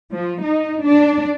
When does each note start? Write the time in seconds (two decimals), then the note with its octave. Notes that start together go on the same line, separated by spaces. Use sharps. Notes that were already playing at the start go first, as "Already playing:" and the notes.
0.13 F3
0.44 D#4
0.84 D4